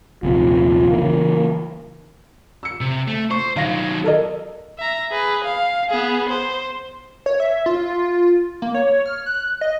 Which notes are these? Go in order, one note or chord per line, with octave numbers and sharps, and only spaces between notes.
A#1 D#2 C3 F4
C#3 E3 A#3
E6 C#7
C3
A3
C5 C#6
D#3 F#3 F5 A#6
A4 A#4 D#5
E5 A#5
G#4 B4
F5
B3 G#4
C5
C#5
E5
F4
A#3
C#5
F6
F#6
D#5